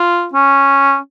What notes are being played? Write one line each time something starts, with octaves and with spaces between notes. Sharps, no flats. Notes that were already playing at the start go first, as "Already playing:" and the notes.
Already playing: F4
C#4